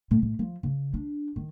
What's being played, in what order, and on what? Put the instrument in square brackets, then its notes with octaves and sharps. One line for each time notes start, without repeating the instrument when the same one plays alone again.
[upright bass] A2
A2
F3
C#3
D4
D#3